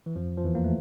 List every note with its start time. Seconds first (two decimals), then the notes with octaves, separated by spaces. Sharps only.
0.06 E3
0.16 F2 F3
0.37 F3
0.44 E2 E3
0.55 A#3
0.64 A3